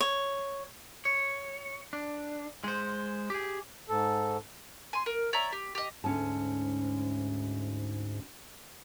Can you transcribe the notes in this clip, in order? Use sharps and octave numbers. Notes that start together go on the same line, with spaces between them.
C#5
C#5
D4
G#3 C5
G4 G#4
G#2 A4
G#5 C6
A#4
C#5 D5 E5 A#5
G4
G4 D#5
D2 G#2 C#4 A5